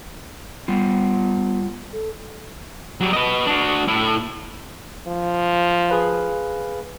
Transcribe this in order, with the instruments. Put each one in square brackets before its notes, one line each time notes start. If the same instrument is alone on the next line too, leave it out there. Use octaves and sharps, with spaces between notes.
[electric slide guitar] G3 F4 [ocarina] B3
[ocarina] A4
[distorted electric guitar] F#3 G3
B4 D#5
D4 F#4
A2 E4
[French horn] F3
[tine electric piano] G#4 B4 F5